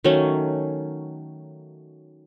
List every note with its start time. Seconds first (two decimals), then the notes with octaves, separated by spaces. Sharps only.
0.04 D#3 F#3 A3 C#4